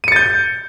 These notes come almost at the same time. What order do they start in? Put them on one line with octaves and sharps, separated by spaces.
D#7 C#7 A6 G6